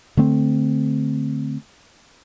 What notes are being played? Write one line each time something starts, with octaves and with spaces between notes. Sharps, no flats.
D3 A3 C4